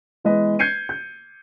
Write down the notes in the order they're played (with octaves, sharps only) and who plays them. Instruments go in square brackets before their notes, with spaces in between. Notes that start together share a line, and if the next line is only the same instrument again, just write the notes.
[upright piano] E3 G#3 B3 B4 D#5
G6 G#6 C7 C#7 D#7
G6